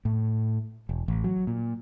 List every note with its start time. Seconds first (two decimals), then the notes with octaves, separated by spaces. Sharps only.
0.05 A2
0.89 E1
1.08 A1
1.24 F#3
1.47 A#2